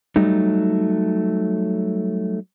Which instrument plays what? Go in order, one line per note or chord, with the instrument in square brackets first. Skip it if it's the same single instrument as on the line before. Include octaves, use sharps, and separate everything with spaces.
[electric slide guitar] F#3 G3 A3 D#4